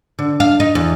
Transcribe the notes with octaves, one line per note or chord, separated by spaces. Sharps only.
D3
F5
D#4
E2